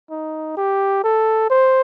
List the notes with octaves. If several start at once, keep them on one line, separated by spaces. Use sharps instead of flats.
D#4
G4
A4
C5